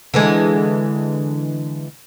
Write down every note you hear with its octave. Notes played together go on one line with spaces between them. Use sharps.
D3 E3 G#3